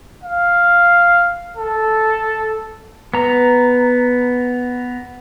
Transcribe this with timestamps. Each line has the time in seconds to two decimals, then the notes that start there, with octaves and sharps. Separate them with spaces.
0.23 F5
1.57 A4
3.14 B3 A#5